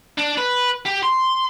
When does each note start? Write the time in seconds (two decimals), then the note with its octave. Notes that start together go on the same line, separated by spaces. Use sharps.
0.18 D4
0.37 B4
0.85 G4
1.03 C6